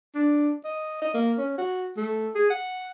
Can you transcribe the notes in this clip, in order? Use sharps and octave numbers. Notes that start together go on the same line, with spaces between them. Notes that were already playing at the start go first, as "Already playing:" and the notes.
D4
D#5
D#5
A#3
C#4
F#4
A3
G#4
F#5